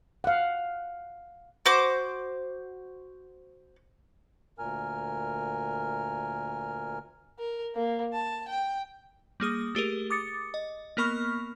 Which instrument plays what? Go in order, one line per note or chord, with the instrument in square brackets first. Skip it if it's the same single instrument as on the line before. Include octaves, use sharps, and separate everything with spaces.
[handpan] F5 F#5
[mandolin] F#4 C5 D6
[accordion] D2 A#2 A#4 G#5 F6
[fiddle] A#4
A#3
A5
G5
[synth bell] G3 A#3 G#4 D#6
A3 G4 G#4 A#4
D6 D#6 A6 C#7
D#5
A#3 B3 A#4 B5 C#6 F6